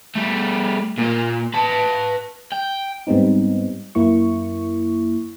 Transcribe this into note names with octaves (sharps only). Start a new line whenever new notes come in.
G3 A3
A#2 A#3
B4 A5
G5
G#2 G3 B3 C4 D#4
F#2 A#3 E4 C#6